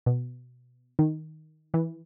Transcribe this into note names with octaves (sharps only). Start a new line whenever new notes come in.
B2
D#3
E3